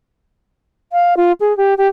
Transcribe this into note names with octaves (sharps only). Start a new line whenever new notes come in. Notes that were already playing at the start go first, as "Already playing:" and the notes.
F5
F4
G#4
G4
G4